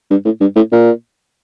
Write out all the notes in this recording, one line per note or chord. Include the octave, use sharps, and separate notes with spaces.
G2
A2
G2
A2
A#2